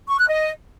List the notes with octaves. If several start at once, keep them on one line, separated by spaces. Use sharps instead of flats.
C#6
F#6
D#5